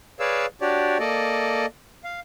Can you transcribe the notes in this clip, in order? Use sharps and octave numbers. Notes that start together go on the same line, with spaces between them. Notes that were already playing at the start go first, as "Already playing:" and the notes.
G#4 B4 C#5 D5 F5 E6
D4 F#4 G4 C#5 D5
A#3 A4 D5 D#5
F5